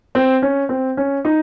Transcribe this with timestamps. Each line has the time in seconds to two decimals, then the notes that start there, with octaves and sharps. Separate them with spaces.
0.15 C4
0.42 C#4
0.69 C4
0.97 C#4
1.25 D#4